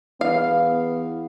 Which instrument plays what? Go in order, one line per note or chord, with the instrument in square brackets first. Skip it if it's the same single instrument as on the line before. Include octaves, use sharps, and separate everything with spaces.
[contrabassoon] E2 [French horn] B3 [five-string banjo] F5